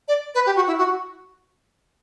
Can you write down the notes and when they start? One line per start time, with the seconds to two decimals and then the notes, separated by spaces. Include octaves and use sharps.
0.08 D5
0.35 B4
0.46 G4
0.56 F#4
0.67 E4
0.78 F#4